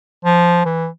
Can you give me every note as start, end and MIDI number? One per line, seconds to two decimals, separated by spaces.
0.25 0.65 53
0.65 0.87 52